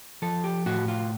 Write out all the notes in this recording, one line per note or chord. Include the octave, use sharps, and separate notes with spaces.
F3 A4
G4
A2 F#4
F4